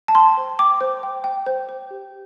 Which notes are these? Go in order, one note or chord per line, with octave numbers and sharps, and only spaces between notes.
A5
G5 C6
C5
G5 D6
C5
G5
G5
C5
C5
G4